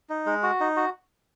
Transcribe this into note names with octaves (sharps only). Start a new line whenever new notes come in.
D#4
G#3
F#4
D#4
F#4